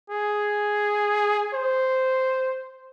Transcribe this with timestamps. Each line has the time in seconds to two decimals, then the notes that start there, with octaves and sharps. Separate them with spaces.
0.10 G#4
1.54 C5